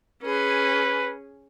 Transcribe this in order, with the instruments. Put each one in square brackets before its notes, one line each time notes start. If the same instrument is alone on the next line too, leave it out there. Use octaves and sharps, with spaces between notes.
[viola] C#4 G#4 [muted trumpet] B4